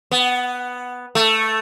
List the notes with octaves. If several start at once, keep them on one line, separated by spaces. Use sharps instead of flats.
B3
A3